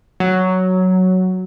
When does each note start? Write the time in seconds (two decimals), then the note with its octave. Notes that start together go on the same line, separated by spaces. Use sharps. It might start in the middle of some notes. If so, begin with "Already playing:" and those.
0.20 F#3